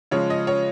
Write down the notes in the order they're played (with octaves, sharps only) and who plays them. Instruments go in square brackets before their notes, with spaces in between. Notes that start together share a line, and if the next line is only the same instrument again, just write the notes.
[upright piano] C#3 F3 G#3 C#5
D#5
C#5